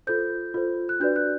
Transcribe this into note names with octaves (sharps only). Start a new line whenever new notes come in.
F4 A4 C5 G6
F4 A4 C5
F#6
D4 F#4 B4 D5 G6
F#6